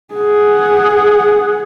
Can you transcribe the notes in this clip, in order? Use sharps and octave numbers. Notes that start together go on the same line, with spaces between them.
G#4 F#5